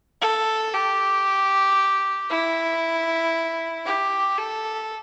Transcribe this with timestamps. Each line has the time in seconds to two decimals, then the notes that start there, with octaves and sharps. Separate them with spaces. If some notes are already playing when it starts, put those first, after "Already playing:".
0.21 A4
0.73 G4
2.30 E4
3.86 G4
4.38 A4